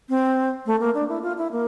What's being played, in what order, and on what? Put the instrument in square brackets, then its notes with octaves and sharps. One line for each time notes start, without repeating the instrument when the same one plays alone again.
[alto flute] C4
A3
A#3
D4
E4
F4
E4
A#3